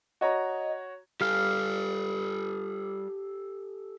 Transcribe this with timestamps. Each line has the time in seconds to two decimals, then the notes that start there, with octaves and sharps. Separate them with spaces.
0.21 F#4 C#5 D#5 A#5
1.21 G3 G4 A4 F5